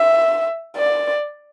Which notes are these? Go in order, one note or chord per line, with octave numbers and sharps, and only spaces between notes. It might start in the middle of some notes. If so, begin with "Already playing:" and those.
Already playing: E5
D5